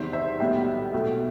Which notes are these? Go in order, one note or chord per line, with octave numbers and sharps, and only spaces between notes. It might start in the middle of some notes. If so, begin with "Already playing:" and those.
Already playing: E2 C3 D#3 G3 B3 C5 E5
C5 E5
B1 A2 G3 B3 E5 G5
B1 B2 A3